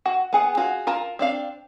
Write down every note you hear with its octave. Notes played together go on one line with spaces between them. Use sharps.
F#4
B3 G#4 F#5
F4 F#4 G#4
F4 A#4 A5
C4 D4 F5